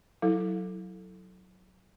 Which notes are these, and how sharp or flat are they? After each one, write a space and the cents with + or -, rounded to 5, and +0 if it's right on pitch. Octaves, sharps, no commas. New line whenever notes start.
F#3 +0 E4 -5 A4 +0